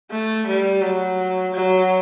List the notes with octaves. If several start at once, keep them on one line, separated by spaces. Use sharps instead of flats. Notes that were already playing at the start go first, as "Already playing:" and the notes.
A3
G3
F#3
F#3